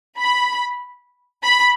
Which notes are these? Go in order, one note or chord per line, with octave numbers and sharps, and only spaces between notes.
B5
B5